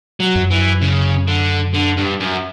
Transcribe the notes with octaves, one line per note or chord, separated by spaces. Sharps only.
F#3
F#2
E3
C#3
D3
D3
G2
F#2